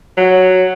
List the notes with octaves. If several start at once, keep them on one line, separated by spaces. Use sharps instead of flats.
F#3